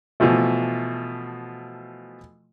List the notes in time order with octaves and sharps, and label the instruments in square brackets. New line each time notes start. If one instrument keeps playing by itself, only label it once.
[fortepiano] B2 E3 F3 A3